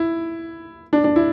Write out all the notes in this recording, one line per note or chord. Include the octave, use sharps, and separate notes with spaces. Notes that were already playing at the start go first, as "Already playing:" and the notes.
Already playing: E4
D4
D4
E4